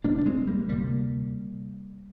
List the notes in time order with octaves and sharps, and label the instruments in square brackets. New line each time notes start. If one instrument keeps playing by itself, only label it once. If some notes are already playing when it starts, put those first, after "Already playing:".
[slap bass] C3 A#3 D4
D2
D4
G#3 C4
G3 A#3
D2 C3 G3 A#3